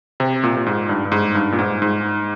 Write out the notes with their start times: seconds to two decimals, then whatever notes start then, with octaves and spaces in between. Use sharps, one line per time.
0.20 C3
0.43 A#2
0.57 A#2
0.66 G#2
0.89 G2
1.05 G2
1.12 G#2
1.35 G2
1.52 A#2
1.59 G#2
1.82 G#2